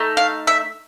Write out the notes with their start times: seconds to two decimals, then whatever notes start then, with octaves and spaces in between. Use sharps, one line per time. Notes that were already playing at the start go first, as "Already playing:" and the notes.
Already playing: A3 D#4
0.17 F5
0.47 E5